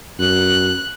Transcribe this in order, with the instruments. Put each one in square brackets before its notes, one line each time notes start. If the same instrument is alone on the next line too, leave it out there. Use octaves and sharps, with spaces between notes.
[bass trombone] F#2 [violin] F#6